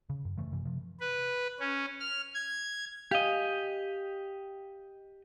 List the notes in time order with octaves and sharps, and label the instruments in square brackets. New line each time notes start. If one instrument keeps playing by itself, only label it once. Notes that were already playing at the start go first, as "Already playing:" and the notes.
[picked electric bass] C#3
F#2
C#3 E3 A3
F#2 C3 E3
C3 F3
[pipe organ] B4
C#4
F6
G#6
[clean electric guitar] G4 D#5 [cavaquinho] F5 G#5